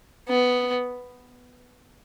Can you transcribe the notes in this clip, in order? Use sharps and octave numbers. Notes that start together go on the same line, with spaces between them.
B3